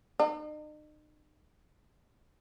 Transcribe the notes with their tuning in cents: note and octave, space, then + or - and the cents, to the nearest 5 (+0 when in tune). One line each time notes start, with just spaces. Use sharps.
D#4 -40